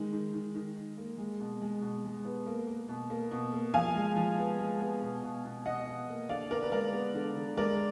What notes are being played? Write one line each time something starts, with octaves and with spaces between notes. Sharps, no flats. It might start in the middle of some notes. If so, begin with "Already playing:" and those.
Already playing: D#3 G#3
D#3
D#3
D#3
D#3
A#3
G#3
B2
G#3
B2
G#3
B3
A#3
A#3
B2
A#3
B2
A#3
F3 F5 G#5
G#3
F3
B3
G#3
B3
B2
B2
B2
B2 D#5 F#5
B2
A#3
D3 D5 F5
B3 A#4 D5
B4
G#3 A#4 D5
B3
D3
D3
G#3 A#4 D5